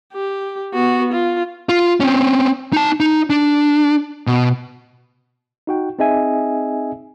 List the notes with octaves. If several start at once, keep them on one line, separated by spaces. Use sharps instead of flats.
G4
B3 F#4
F4
F4
C4 C#4
D#4 A5
D#4
D4
B2
D#4 F#4 G5
C4 D#4 G#4 D#5 E5 G#5